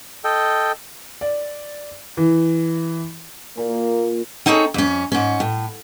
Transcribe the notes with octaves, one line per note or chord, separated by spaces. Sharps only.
A4 D#5 G5
D5
E3
A#2 A#3
C4 D#4 G#4 A4 C#5
F2 C#4
G#2 C#4
A2